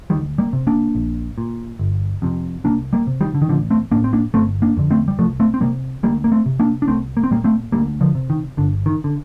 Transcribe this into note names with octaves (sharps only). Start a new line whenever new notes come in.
D2 D#3 G3
G3 A#3
C3
A#3 D4
A#1
A#2
G1
F2 C3
C2 A#3 D4
G3 A#3
C3
D#3 G3
D3
D#3
A1 D3 F3
A3 C4
A2 A#3 D4
C4
A#3 D4
G1 A3 C4
A#3 D4
F2 D3
A3 C4
G3
C2 F3 A3
A3 C4
C4
C3 G3 A#3
D2 G3 A#3
A#3
A3 C4
C3
A#3 D4
D4
C2 A3 C4
A#3
C4
A#2 G3 A#3
A3 C4
D2 G3 A#3
D3 F3
C3
D#3
G1 D3
D#3
D3